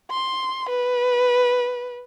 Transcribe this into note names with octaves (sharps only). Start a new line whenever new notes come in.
C6
B4